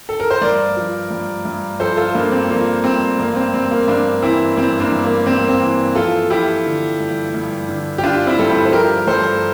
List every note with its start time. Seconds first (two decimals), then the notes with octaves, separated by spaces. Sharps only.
0.09 A4
0.20 A#4
0.31 C5
0.41 G2 A#4 D5
0.77 F3
1.11 G2
1.45 G2
1.80 F3 A4 C5
1.97 F4 A4
2.15 G2 A#3 D4
2.32 C4
2.49 F3 A#3
2.84 G2 C4
3.19 G2 A#3
3.36 C4
3.54 G2 C4
3.71 A#3
3.88 G2 A#3 D4
4.22 E3 C4 E4
4.57 G2 C4 E4
4.80 A#3 D4
4.92 G2
5.04 A#3
5.26 G2 C4
5.37 A#3
5.48 C4
5.61 E3
5.95 F3 F4 A4
6.30 F3 E4 G4
6.66 D3
7.00 G2
7.34 G2
7.69 D3
7.98 G4
8.03 D3 D4 F4
8.27 C4 E4
8.39 G2 A4
8.50 E4 G4
8.65 C5
8.72 F3 G4 A#4
9.07 G2 A4 C5